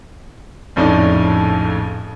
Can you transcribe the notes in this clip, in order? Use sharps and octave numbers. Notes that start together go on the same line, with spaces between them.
A#1 F2 A2 C#4 D#4 D5